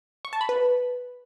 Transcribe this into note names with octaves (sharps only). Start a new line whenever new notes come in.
C#6
A5
B5
B4